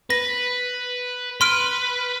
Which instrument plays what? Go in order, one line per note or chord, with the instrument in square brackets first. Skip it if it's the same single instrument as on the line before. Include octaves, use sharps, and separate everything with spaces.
[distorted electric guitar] B4 [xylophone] A#6
[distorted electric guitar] B4 [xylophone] C6 F6 D7